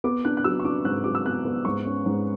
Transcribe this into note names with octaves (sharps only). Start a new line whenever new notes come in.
B3 D6
D4 F#6
F#6
F#3 E6
C#6
D4 D6
G#2 F#6
F#3 D6
E6
B3 F#6
B3
G#2 C#6
C#4
G#2